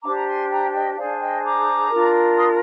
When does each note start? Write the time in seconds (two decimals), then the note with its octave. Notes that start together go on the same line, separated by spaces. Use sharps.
0.03 D4 G4 C5 A#5 D6
0.16 A#5
0.27 G#5 C6
0.50 G5 A#5
0.73 D#5 G5
0.97 D4 G#4 C5 D5 F5
1.20 D#5 G5
1.43 A#5 D6
1.90 D4 F4 A#4
2.37 C6 D#6